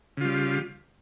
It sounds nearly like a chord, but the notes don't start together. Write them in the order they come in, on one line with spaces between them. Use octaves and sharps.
C#3 F4 G3